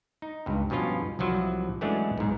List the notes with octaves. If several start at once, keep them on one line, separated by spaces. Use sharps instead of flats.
D#4
C#2 G2
G2 B2 F3 C#4 F4
C2 C3 F3 F#3
E3 F#3 G#3 A3 C#4 D4
B1 G#2